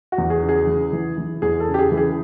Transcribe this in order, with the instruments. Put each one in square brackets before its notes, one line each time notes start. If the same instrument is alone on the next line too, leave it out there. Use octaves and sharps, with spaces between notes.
[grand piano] F#4
E2
G#4
C#3
G#4
E3
E3
E3
E2 G#4
A4
C#3
G4
G#4
E3
G#4